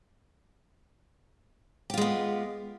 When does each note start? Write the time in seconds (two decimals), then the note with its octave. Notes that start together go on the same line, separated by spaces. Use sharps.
1.90 G4
1.94 F4
1.97 G#3
2.01 B3